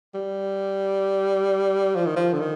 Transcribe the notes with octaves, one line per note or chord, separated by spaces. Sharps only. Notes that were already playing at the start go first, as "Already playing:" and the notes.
G3
F3
D#3
F3
D3
D#3